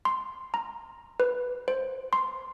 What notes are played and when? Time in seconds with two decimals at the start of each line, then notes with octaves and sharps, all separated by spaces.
0.05 C6
0.54 A#5
1.20 B4
1.68 C5
2.13 C6